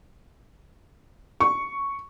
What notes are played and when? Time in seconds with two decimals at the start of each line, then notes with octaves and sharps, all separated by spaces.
1.40 C#6